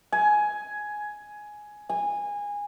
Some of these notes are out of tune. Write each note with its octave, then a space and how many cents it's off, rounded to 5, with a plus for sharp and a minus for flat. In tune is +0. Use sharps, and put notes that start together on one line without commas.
G#5 +10
G#5 -20